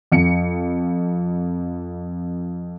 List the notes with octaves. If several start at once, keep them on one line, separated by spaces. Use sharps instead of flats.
F2 C#7